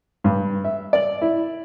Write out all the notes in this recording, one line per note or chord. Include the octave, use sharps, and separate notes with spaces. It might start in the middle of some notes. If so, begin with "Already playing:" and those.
G2
E5
D5
E4